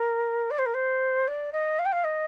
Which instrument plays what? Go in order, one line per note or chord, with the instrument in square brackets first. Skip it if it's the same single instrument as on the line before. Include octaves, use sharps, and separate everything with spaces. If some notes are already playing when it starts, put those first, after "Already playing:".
Already playing: [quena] A#4
D5
C5
A#4
C5
D5
D#5
F5
G5
F5
D#5